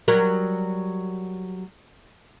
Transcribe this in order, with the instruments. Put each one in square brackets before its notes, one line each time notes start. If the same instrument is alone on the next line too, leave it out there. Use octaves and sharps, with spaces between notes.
[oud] F#3 G3 A#4